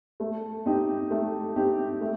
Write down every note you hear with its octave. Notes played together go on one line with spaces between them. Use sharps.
A3
C4 D#4 G4
A3
C4 D#4 G4
A3